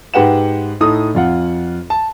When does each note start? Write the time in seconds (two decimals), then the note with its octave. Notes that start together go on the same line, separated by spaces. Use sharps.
0.14 G#2 G4 B4 F#5 G5 E7
0.81 A2 D#4 A4 D#6
1.15 F2 F4 F#5
1.90 A5